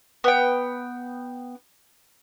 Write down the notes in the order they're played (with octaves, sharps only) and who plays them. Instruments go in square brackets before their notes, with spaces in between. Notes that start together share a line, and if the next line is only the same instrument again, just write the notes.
[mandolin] B3 G5